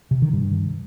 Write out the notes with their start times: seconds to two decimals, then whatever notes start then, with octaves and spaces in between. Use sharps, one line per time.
0.11 C3
0.22 D#3
0.33 G2